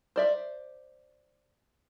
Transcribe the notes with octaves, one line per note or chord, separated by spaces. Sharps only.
C5 D5 E5